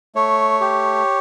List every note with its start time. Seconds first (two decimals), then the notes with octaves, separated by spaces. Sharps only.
0.15 A3 C#5
0.61 G4